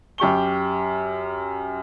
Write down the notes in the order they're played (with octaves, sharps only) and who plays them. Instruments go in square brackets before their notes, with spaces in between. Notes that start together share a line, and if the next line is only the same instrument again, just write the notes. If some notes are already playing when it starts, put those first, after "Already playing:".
[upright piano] F#2 G4 C#6 G7